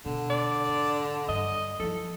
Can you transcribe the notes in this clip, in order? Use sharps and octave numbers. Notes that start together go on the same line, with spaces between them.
B2 D3
D5
G#2
G2 D#5
F3 E4 A4